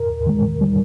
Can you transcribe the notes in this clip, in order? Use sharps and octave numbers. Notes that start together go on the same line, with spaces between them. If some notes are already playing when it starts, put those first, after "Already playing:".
Already playing: A#4
D#2
D#3 G#3
D#2
D#3 G3